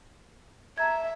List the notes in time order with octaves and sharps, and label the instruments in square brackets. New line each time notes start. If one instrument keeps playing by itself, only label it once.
[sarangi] E5 [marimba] A5 A#5 G#6